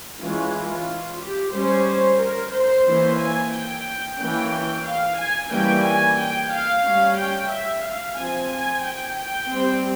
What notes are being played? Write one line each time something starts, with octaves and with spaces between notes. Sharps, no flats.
E3 G#3 C#4 F4
F4
G4
G3 C#4 C5
A#4
C5
E3 A#3 C#4
G#5
G5
E3 A#3 C#4 G5
F5
G#5
E3 G3 A#3 C#4 G5
G#5
G5
F5
G3 C#4
G5
E5
F5
F3 C4 G#5
G#5
G5
G5
G3 C4